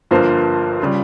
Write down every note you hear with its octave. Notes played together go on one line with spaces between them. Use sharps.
G1 G2 F3 A#3 C5
C#3 G3 F4